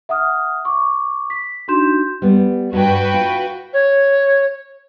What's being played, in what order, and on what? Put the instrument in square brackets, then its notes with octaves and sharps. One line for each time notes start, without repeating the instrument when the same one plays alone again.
[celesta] E5 F#5 D#6 F6
C#6 D6
B6
D4 D#4 F#4 C6 G6 E7
[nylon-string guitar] G3 B3
[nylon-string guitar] G2 [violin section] F#4 B4 G5
[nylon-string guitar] F4
[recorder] C#5